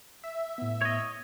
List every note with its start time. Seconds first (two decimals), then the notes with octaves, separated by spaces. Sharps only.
0.24 E5
0.58 A2 B3
0.82 C#5 D#5